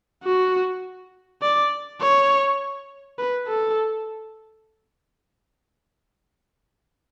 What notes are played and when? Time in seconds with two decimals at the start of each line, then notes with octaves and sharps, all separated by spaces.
0.24 F#4
1.42 D5
2.01 C#5
3.18 B4
3.48 A4